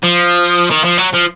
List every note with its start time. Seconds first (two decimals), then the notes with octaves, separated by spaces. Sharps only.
0.03 F3
0.71 D#3
0.85 F3
0.98 F#3
1.14 F3